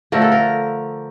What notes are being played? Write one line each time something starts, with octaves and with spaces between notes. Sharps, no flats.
D3 F3 A3 A#4
A4
A#4